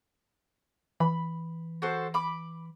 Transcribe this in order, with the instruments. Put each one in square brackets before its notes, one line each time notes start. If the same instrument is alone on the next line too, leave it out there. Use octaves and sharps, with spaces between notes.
[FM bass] E3 [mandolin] B5
[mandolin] F#4 A4 C5
B5 D6